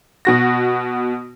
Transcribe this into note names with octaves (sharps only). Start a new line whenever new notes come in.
B2 F#4 A#6